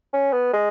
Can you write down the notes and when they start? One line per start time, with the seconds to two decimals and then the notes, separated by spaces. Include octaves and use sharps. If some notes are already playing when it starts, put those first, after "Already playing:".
0.14 C#4
0.33 B3
0.53 G#3